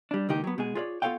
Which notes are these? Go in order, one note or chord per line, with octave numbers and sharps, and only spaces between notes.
G3 D4
C#2 A#2 D#3 D#4 G4
F#3 B3
B2 G#3 G#4
F4 G#4 A#4 C#5 D5
B3 F4 A4 C#5 F5 G5